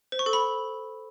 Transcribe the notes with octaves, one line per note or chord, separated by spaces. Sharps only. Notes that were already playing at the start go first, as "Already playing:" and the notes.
C5
C#6
A4
B5